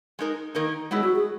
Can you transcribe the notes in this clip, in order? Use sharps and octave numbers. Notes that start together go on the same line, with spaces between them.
G#3 D#4 A#4
D#3 A#3 D#4 A#4
F#3 G#3 B3 E4
F#4
G#4